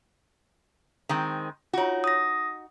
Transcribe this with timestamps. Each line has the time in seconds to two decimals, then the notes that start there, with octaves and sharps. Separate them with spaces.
1.09 D#3 G#3 C4
1.74 D#4 F4 F#4 C#5
2.04 D#6 A#6